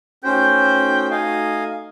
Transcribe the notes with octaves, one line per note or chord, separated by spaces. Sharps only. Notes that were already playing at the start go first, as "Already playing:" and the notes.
A3 C#4 D#4 F#4 C5 G5
D#5 F5 G#5